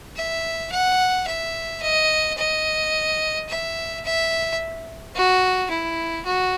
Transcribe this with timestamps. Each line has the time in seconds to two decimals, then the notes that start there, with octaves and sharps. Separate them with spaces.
0.16 E5
0.72 F#5
1.27 E5
1.82 D#5
2.38 D#5
3.49 E5
4.04 E5
5.15 F#4
5.70 E4
6.25 F#4